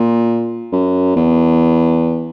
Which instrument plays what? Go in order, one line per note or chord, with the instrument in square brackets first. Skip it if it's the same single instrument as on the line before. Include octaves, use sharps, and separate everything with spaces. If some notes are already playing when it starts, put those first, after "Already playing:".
Already playing: [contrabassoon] A#2
F#2
E2